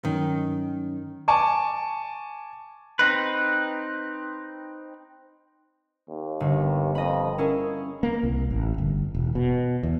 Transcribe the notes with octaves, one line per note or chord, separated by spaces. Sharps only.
G2 D#3 F#3 C#4
G#5 A5 C#6 D6
C4 D#4 B4
D#2
G1
F2 D#5 B5
C#4 E4 G#4 A#4
A#3
C2
A1
G1
E1
B2
E2